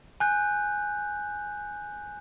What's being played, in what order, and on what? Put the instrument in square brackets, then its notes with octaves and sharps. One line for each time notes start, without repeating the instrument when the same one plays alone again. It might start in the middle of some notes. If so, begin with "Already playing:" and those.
[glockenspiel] G#5 F#6 G6